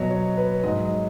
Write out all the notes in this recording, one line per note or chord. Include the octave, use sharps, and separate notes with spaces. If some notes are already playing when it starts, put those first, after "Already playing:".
Already playing: B2 F#3 D#5
C#5
B4
G#2 F#3 D#5